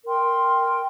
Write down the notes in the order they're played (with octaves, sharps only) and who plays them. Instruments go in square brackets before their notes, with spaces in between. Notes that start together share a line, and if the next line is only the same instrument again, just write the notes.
[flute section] A#4 G5 C6